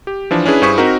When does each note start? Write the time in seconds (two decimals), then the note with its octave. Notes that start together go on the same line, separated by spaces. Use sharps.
0.07 G4
0.31 E3 F3 D4
0.46 C#4 D4 E4 G#4 B4
0.62 G2 E4 G#4 C5 C#6 B6
0.78 C4 D#4 F#4 A#4